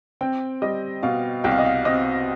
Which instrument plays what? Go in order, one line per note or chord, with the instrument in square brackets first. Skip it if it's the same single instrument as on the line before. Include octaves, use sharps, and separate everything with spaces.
[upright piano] C4 G5
G3 D#5
B2 F5
C2 G5
F5
D#5
F5
C4 D#5